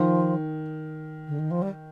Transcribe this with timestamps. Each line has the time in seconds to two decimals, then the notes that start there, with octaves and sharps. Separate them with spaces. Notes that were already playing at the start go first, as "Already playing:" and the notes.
Already playing: D#3 F3
1.28 D3
1.39 D#3
1.51 F3
1.62 G3